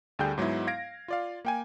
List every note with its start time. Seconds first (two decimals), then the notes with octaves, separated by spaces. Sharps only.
0.19 D2 D3 G3 G#4 G5 G6
0.38 G#2 F#3 G#3 B3 E4
0.67 F5 G#6 A#6 D7
1.08 F4 D5 F5
1.45 A#3 G5 G#5